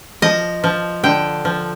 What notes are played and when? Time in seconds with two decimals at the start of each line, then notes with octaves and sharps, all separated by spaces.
0.22 F3 D#5
0.64 F3
1.04 D3 G5
1.45 F3